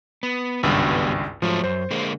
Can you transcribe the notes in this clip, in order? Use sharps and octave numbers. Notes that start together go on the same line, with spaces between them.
B3
G#1 C#2 G2 G3 B3 F#4
G#2 F3 F#3 A3
F#2 C5
D3 G#3 A#3